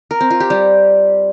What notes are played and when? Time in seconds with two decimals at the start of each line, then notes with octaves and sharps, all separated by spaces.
0.11 A#4
0.21 C4
0.30 F4
0.40 G4
0.50 G3